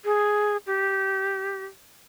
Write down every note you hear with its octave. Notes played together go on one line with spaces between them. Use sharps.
G#4
G4